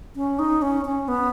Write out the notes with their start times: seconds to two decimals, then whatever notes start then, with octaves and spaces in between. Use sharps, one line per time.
0.16 C#4
0.39 D#4
0.62 C#4
0.85 C#4
1.08 B3